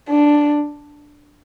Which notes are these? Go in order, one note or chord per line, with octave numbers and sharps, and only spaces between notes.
D4